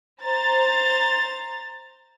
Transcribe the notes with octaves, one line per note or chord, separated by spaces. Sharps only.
C5 A#5 A6